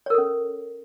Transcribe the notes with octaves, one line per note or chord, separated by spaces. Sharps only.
C#4 A4 A#4 C#5